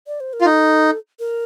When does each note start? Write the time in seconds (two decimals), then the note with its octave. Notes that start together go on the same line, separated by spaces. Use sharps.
0.07 D5
0.20 C5
0.33 A#4
0.41 F4
0.46 D#4 A4
1.20 A#4